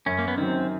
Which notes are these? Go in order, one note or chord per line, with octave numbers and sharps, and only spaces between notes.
F#2 C#4
A#3
B3
D#3 F#3 C4